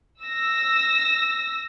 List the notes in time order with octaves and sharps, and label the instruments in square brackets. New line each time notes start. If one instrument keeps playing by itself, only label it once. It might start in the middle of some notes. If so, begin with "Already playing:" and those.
[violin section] E6 A#6